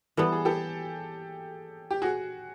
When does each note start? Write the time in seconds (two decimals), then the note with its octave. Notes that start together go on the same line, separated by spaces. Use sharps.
0.17 E3 G3 B3 A4
0.32 G#4
0.45 G4 A4
1.91 G4
2.02 F#4 G#4